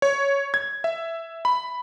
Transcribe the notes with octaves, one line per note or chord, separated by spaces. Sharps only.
C#5
G#6
E5
B5